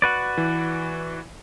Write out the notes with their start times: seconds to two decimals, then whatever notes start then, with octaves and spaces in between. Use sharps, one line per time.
0.02 F#4 B4 D5
0.37 E3